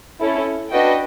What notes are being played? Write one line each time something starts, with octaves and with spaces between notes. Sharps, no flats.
C#4 E4 A4
D4 F#4 B4 D#5 G5